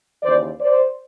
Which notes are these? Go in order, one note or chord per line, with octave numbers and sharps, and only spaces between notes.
D#2 C#3 E3 C5 D5
C5 D5